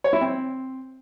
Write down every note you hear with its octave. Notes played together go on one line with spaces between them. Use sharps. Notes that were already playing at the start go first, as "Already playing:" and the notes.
C#5
E4
C4